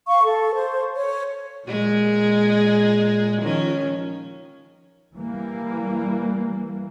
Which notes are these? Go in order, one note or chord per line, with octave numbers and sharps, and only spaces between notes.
F5 C#6
A4
C5
C#5
A#2 G#3 G#4
D#3 F3 C#4
E3 G3 A#3